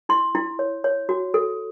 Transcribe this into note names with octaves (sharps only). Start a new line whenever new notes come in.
E4 C6
E4
C#5
C#5
F#4
A4